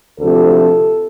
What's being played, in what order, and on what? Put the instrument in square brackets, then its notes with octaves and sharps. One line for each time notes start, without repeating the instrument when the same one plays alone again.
[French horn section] D2 C3 F3 A4